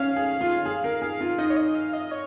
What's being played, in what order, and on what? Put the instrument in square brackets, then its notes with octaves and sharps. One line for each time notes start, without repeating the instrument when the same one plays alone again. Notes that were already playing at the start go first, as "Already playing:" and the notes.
Already playing: [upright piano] C#4 [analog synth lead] F5
[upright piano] G#4
F4
G#4
A#4
G#4
F4
[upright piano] D#4 [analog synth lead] D#5
[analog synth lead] C#5
D#5
F5
D#5
C#5